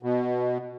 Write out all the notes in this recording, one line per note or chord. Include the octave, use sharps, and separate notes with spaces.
B2